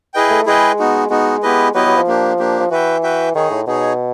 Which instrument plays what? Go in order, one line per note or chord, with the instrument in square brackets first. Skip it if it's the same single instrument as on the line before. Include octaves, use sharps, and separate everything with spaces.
[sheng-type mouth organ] E4 G#4 B4 D#5 G5
[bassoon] A3
[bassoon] G#3 [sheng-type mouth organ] E4 G#4 B4 D#5 G5
[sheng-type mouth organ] B3 D#4 F#4
[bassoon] G#3 [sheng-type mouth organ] B3 D#4 F#4
[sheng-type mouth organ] B3 E4 G4 B4 D#5
[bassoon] F#3 [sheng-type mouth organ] B3 E4 G4 B4 D#5
[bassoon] F#3
F3
[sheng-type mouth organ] A#3 D4 G4
A#3 D4 G4
[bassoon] F3
[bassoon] E3 [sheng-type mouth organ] F#4 B4 E5 G5
[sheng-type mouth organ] F#4 B4 E5 G5
[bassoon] D#3 [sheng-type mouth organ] D#4 G#4 C#5
[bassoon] A2
[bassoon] B2 [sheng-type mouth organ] D#4 G#4 C#5